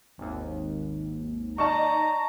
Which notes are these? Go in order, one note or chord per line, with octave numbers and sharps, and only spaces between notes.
G#1 D#2
D#4 D5 D#5 A5 A#5 C#6